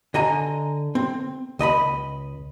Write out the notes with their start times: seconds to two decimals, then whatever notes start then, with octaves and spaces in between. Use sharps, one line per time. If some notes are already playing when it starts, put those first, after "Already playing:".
0.14 D3 D#5 G#5 A#5
0.95 C4
1.59 C#2 D#5 A#5 B5